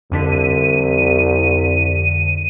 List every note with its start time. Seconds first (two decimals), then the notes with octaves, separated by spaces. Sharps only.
0.12 C2 F2 D3 B6 D#7